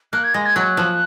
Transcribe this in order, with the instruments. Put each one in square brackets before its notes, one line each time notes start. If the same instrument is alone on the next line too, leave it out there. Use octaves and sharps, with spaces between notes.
[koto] A#3 [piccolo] F#6
[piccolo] G#6
[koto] G#3 [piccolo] A#6
[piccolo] G#6
[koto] F#3 [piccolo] F#6
[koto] F3